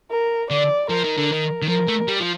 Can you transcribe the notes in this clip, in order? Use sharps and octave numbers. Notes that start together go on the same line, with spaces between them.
A#4
D3 D5
F3 A#4
D#3
D3
D#3
D#3
F3 A#4
A3
G3
F3